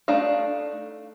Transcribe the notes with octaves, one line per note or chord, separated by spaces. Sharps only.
A3 D4 D#4 F5